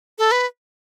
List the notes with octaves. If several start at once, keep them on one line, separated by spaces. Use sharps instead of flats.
A4
B4